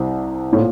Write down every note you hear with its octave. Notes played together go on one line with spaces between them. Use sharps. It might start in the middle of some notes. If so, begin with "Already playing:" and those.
Already playing: C2 C3
A2
A#2